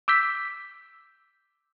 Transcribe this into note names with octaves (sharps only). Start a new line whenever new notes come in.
D6 E6 G6 B6